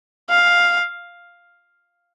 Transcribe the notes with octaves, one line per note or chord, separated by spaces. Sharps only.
F5